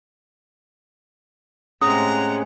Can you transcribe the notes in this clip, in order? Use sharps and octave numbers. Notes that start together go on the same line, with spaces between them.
A2 C3 G#3 C#4 G#4 F#5 A#5 D#6